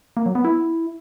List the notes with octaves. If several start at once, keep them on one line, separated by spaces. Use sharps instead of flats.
A#3
F#3
B3
E4